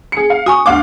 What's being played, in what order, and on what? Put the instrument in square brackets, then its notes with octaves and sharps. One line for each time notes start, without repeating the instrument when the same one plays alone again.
[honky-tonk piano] G#4 C#7
F5
[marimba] F#4 G#5 C#6 [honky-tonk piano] D#6
[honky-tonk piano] D2 F5 D6